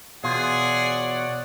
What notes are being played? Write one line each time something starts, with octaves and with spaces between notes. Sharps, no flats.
B2 E3 F4 G#4 C#5 D5 F#5